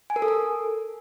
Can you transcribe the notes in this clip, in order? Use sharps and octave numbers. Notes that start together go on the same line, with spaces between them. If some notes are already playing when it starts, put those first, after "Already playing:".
G#5
A#4
A4
A#4